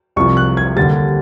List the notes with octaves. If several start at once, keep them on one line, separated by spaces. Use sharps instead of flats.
C2 C3 F3 C#6
F#6
G#6
D#2 D3 G3 A6